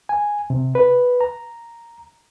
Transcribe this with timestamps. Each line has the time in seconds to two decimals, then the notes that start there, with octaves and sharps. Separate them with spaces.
0.09 G#5
0.50 C3
0.75 B4
1.21 A#5